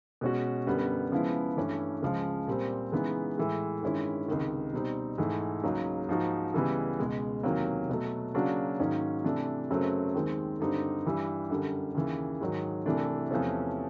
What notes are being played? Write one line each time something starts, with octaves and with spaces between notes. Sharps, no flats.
B2 G#3 C#4 F#4
F#2 D3 G3 B3
C#3 F3 G#3 B3 E4
G2 E3 A3 C#4
C#2 C#3 F3 G#3
A#2 G3 C4
C#3 E3 G#3 B3 D#4
A2 E3 G#3
G2 D#3 G#3 C#4 E4
C#2 C3 D#3
B2 G3 C4 D#4
G#2 E3 A3
C#2 C#3 F#3 A#3 D#4
G#2 F3 A#3 D#4 F#4
C#2 C#3 E3 G3 B3
C#2 B2 G#3
E2 C3 D#3 F#3 A#3
B2 F#3 A3
C#3 F#3 A#3 D4 F#4
G#2 D#3 F#3 A#3 C#4
C3 E3 A3 D4
F#2 C#3 F#3 A3 C4
D#2 D#3 G#3 C4
G2 D3 G3 C4 D#4
G2 E3 G3
F#2 D3 G3
D#2 C#3 E3
G#2 D#3 F#3
C2 C3 E3 A3 D4
E2 C3 F3 A3 C#4